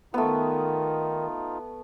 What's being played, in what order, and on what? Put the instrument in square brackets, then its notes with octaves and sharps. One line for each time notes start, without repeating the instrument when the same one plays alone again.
[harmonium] D#3 [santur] A3 B3 [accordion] D#4 F4